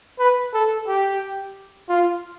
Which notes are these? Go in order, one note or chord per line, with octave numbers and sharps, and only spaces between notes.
B4
A4
G4
F4